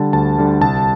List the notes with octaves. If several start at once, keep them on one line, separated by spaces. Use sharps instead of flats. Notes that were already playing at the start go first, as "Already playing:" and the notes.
Already playing: D3 G3 A5
D2 A5
D3 G3
C2 A5